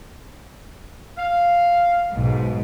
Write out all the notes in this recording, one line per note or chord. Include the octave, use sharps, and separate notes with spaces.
F5
B1 G#2